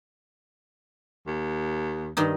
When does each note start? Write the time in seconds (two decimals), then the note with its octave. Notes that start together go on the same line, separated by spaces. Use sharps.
1.27 D#2
2.17 G2 D#3 D#4